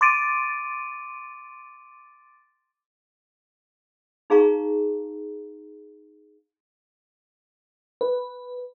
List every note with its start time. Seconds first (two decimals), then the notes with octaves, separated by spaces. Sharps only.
0.01 C6 D6 A6 D7 D#7
4.30 D#4 G#4 F5 A#5 C#6
8.01 B4